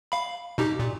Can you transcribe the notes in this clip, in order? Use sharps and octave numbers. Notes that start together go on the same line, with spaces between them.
F5 B5
B2 D#4 G4
A#2